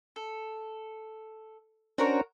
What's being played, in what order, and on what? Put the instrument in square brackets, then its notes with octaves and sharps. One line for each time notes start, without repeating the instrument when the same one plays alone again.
[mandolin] A4
[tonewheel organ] C#4 D4 C5 [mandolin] F#4 A#4 C#5